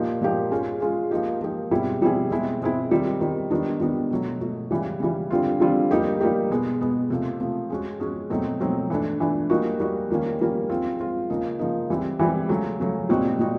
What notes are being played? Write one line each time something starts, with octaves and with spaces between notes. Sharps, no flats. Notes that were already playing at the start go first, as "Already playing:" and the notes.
Already playing: A#2 F3 A#3 D#4 G4
A#2 F3 A#3 D#4 G4
G#3 C#4 F4 G#4
G#3 C#4 F4 G#4
F3 A#3 D#4 G4
F3 A#3 D#4 G4
B2 G3 C4 E4 G#4
B2 G3 C4 E4 G#4
B2 G#3 C4 E4
B2 G#3 C4 E4
D#3 G3 C4
D#3 G3 C4
D#3 G3 B3 D4
D#3 G3 B3 D4
B2 F#3 A3
B2 F#3 A3
C#3 E3 G3
C#3 E3 G3
D3 G3 C4 F4
D3 G3 C4 F4
G3 A#3 D#4 G4
G3 A#3 D#4 G4
B2 G#3 B3
B2 G#3 B3
C3 F3 A3
C3 F3 A3
G#3 C#4 F#4
G#3 C#4 F#4
B2 F#3 A3 C4 D#4
B2 F#3 A3 C4 D#4
E3 A3 D4
E3 A3 D4
G3 A#3 D#4 F#4
G3 A#3 D#4 F#4
D#3 G3 A#3 C#4
D#3 G3 A#3 C#4
G#3 C4 F4
G#3 C4 F4
C#3 F3 A#3 D#4
C#3 F3 A#3 D#4
E3 G3 C4
E3 G3 C4
C#3 F#3 A3
C#3 F#3 A3
A#2 G3 C4 D#4 F#4
A#2 G3 C4 D#4 F#4